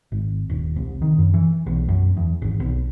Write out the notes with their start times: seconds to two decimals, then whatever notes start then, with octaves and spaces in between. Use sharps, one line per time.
0.12 G#1
0.50 D#1
0.76 C2
1.02 D#3
1.18 F#2
1.34 E3
1.66 B1
1.88 F#2
2.17 E2
2.42 G#1
2.60 B1